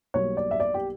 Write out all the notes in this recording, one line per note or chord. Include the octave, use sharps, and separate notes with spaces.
B1 B2 G3 A#3 C#5
D5
E5
D5
G4